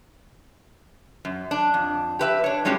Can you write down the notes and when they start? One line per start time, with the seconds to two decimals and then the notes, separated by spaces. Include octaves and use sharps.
1.25 F#2
1.51 D4
1.74 F2
2.19 G4 B4 E5
2.44 D4 C#5
2.65 A2 G3 G#3 C#4 F#4 G4